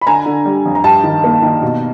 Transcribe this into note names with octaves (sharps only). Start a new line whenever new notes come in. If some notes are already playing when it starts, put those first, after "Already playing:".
B5
D3 G#5 A#5
D3
G3
F2
A#5
G2 G5 A5
D#3
A#3
D#3
B2